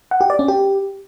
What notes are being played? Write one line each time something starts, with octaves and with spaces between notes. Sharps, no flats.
F#5
G4
D5
C#4
G4